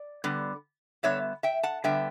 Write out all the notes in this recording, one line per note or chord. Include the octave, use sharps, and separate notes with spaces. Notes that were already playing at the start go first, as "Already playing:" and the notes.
Already playing: D5
D3 G3 B3
D3 G3 B3 C#5 E5
E5 G5
F#5 A5
D3 G3 B3 E5 G5